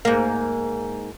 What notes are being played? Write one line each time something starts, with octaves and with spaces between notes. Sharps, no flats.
G#2 A#3